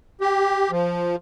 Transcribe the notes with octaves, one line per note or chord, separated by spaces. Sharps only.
G4
F3